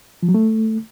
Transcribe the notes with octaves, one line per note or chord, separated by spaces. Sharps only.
F3
F#3
A3